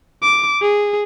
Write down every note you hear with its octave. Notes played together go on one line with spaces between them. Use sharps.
D6
G#4